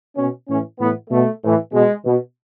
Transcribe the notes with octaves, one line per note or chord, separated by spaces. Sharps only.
B2 C#4
A2 E3 C#4
A2 E3 B3
B2 A3
A2 E3
B2 G#3
B2